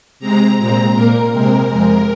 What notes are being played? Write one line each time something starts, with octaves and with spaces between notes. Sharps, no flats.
C3 G#3 C4 A#5
A#2 G#3 C4 A#5
A#2 A#3 A#4
C3 G#3 C4 A#4
F2 C3 G#3